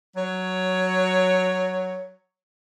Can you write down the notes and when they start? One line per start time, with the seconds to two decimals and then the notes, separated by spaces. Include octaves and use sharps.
0.16 F#3 C#5